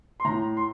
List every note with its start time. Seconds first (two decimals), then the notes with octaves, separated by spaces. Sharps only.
0.20 C6
0.25 A2 A#5
0.57 C6